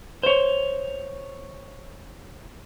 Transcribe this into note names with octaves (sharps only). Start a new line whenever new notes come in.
C5 C#5